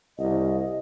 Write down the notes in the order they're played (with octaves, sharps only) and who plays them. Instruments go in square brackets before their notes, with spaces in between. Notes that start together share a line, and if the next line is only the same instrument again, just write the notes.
[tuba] C2 [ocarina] D#5